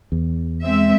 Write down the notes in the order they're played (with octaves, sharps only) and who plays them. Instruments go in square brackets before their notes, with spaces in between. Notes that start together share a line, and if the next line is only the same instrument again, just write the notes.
[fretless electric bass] E2
[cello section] G#3 C4 E5